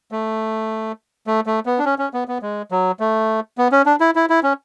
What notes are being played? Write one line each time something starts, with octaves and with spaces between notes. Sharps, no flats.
A3
A3
A3
B3
D4
C#4
C#4
B3
B3
G#3
F#3
A3
B3
C#4
D4
E4
E4
E4
C#4